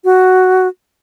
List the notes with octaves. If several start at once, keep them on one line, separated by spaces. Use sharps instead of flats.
F#4